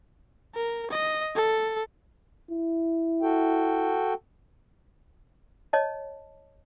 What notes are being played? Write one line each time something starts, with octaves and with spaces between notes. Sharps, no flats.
A#4
D#5
A4
E4
F#4 A4 G5
C#5 D#5 A5